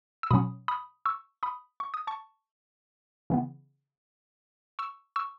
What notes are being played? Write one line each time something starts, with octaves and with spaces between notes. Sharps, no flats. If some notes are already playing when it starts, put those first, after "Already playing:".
E6
B2 F#3 C#4 B5 D#6
B5 D#6
C#6 E6
B5 D#6
C#6
D#6
A5 C#6
C#3 E3 B3
C#6 E6
C#6 E6